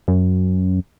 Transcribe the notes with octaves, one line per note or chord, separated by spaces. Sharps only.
F#2